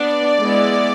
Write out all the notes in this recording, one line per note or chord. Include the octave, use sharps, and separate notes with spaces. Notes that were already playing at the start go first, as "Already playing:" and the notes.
Already playing: B3 D4 D5
G#3 B3 E4